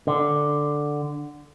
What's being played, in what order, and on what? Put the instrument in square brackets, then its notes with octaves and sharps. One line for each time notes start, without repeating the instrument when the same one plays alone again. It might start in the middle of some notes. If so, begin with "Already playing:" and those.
[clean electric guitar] D3